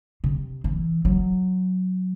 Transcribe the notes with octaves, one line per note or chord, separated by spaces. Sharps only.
C3
E3
F#3